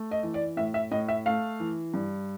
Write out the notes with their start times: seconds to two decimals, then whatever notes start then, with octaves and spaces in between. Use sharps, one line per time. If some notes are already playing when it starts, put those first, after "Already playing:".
Already playing: A3
0.11 D#5
0.23 E3
0.34 D5
0.57 A2 E5
0.74 E5
0.91 A2 D#5
1.08 E5
1.26 A3 F5
1.60 E3
1.94 G2